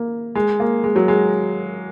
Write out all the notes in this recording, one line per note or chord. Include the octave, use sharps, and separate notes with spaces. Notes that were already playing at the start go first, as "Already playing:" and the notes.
Already playing: A#3
G#3
A#3
G#3
F#3
G#3